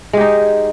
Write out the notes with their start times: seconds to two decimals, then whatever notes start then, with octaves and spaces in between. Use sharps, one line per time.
0.13 G#3
0.17 G4
0.21 D#4